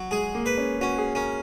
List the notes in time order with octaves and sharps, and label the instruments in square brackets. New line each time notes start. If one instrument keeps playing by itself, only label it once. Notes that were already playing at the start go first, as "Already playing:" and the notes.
Already playing: [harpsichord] F#3
[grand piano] G#3 [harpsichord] G#4
[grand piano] A#3
[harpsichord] B4
[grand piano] C#4
[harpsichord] C#4 [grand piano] F#4
[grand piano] G#4
[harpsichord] C#4 [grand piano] A#4